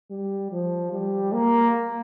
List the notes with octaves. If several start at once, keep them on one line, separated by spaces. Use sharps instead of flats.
G3
F3
G3
A#3